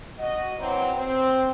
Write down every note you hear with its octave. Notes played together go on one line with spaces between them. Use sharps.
F#4 D#5
E3 F#3 C4
C4